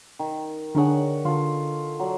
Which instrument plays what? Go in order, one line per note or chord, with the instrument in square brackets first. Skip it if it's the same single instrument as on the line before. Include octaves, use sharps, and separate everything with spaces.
[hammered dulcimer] D#3
[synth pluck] D3 D4 G#4 [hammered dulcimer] A#4 C#5 F#5
[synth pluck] D3 [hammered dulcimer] F4 A4
[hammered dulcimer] F#3 D5